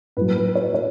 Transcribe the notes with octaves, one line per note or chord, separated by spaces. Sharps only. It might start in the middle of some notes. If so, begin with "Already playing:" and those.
A2 F#3 B4
B4
C#5
C#5